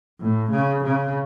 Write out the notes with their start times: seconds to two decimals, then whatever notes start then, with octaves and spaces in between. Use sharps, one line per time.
0.20 A2
0.51 C#3
0.83 C#3